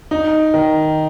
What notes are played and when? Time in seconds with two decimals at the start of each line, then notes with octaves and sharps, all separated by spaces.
0.11 D#4
0.54 D#3